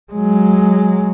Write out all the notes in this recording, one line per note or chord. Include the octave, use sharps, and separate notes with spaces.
F#3 G#3